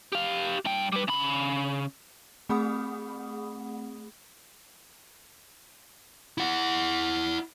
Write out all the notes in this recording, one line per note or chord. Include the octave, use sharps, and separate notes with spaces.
G4 F5
G2 G5
G3 B4
C#3 B5
A3 C4 G#4 F#5 B5 D#6
E4 F#5